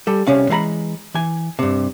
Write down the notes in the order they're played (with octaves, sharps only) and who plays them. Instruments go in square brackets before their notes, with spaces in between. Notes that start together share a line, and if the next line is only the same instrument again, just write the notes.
[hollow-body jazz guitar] G3 A4
C2 C3 C#4 F5
E3 G#3 F5 A#5 B5
E3 G#5
G2 C3